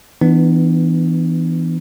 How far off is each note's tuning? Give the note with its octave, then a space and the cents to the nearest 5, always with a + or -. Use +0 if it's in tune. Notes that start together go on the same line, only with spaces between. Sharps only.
E3 +0 B3 +20 D4 +40